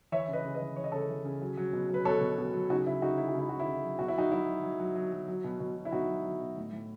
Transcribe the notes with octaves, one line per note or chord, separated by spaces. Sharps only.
E3 C#5 E5
C#3
B4 D#5
C#3
B4 D#5
E3
E3 C#5
D#5
C#3 A4 C#5
E3
C#3
F#3
F#3
B2
F#3 B4
B2 A4 C#5
B2
B2
F#3
C#3 D#4 F#4
C#3 E4
C#3 D#4 F#4
F#3 E4
F#4
C#3 E4
C#3 F#4
E4
C#3
F#3
B2 F#4
E4
F#3 D#4 F#4
F#3 E4
F#3
F#3
F#3
F#3
F#3
F#3
B2
B2
F#3
E4
B2 D#4 F#4
F#3
F#3
B2
A2
A2